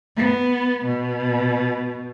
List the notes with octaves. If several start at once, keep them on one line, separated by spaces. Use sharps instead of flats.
B3
B2